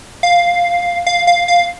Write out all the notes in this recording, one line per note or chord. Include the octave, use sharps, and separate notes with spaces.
F5
F5
F5
F5